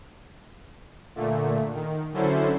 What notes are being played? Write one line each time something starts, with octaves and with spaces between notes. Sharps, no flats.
A#2 D3 A3
D#3
D3 F#3 C#4 E4 A4 C5